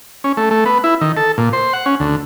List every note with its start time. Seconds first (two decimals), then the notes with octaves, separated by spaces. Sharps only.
0.24 C#4
0.37 A3
0.51 A3
0.66 B3
0.84 E4
1.01 D#3
1.17 A4
1.38 A#2
1.53 C5
1.73 F#5
1.86 C#4
2.00 D2